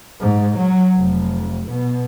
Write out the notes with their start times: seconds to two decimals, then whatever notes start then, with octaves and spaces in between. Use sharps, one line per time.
0.20 G#2
0.57 F#3
0.96 F1
1.69 B2